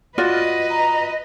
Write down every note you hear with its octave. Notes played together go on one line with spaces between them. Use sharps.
F4 F#4 B4 D5 D#5
A#5